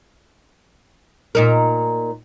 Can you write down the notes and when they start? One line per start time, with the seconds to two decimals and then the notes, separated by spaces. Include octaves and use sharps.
1.35 A#2 D#4 A#4